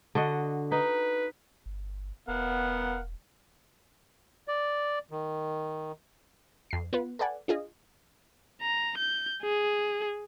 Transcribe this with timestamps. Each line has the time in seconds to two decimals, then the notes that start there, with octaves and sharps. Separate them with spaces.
0.15 D3 F#4 D#5
0.72 D#4 B4
1.66 G1
2.28 E1 B3 A#4 F5 F#5
4.48 D5
5.11 D#3
6.71 F2 C7
6.93 B3 F4 B4
7.19 A4 B4 D5 F#5 G#5
7.48 D4 F4 G#4 D#5
8.62 A#5
8.97 G6
9.43 G#4